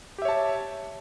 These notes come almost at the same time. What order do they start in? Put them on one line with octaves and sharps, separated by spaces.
G4 E5 C#5 A5